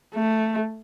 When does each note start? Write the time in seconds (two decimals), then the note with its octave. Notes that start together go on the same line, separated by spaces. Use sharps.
0.14 A3